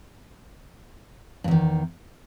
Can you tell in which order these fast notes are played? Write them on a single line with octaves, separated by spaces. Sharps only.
G2 E2 D#3